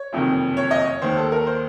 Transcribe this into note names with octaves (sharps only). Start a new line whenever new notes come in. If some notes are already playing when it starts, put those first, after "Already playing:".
Already playing: C#5
F#1 F2 C3 D#3
C#5
D#5
C#5
D#2 D#3 C5
A4
A#4
C5